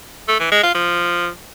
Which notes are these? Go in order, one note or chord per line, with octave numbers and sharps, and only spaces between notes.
A3
E3
G#3
F4
F3